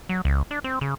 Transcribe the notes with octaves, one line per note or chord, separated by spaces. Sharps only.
F#3
C#2
D4
C4
C#3